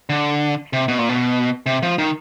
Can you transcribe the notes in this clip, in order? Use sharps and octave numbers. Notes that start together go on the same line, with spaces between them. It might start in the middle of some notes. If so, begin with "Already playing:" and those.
D3
C3
B2
A#2
B2
C3
F3
D#3